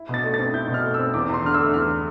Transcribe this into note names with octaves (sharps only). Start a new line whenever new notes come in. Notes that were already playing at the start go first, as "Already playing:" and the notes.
Already playing: E4
B2 A6
A3
A6
C4
E4 G6
B2
F6
A3
E6
C4
E2 D6
E2
C6
D3 F6
E6
A3
E2 F6